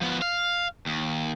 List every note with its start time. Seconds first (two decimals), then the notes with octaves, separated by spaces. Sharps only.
0.01 F3 B3
0.22 F5
0.86 D#2